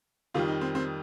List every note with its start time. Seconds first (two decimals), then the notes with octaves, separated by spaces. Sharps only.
0.34 F2 D#3 G3 F4
0.48 D#4
0.61 C4
0.75 C4